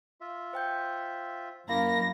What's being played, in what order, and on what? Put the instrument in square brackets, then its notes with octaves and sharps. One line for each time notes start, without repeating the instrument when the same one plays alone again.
[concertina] F4 E5
[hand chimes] C5 G5 G6
[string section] F#2 A#6 [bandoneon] A#3 [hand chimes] E4 F5 B5